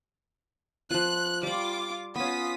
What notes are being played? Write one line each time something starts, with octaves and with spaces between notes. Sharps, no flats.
F3 F4 F#6
G3 F4 D5 D6
B3 C#4 F4 D#6 B6